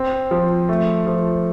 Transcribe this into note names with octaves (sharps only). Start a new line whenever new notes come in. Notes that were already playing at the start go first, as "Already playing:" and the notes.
Already playing: C4
F3
A3
F3